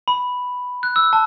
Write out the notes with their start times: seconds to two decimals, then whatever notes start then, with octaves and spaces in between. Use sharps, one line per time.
0.08 B5
0.83 F#6
0.96 E6
1.13 A5